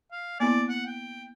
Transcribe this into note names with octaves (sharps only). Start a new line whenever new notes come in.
F5
A#3 B3 E4 D5
F#5
G5